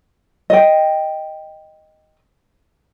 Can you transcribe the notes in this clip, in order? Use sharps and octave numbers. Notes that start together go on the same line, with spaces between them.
D#5 G5